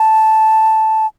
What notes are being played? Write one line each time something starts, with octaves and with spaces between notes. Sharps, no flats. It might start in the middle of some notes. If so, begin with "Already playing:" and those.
Already playing: A5